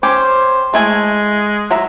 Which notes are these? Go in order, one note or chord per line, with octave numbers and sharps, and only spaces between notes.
C#4 G4 C5
G#3 A3 E4 G#5
F#3 E5 A#5